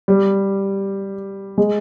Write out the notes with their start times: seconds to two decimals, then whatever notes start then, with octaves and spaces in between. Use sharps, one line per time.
0.08 G3
1.58 G#3